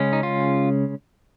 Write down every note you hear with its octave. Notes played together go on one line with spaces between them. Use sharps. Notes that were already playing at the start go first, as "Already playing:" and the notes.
Already playing: C#3 G#3 C#4
D#4
F4